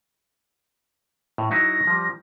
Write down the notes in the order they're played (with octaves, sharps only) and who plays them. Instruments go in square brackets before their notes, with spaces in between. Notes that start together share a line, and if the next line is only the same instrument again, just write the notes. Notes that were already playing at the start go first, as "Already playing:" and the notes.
[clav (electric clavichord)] A2
[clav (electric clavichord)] F#3 D#4 E4 [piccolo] A#6
[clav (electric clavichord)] F3 G3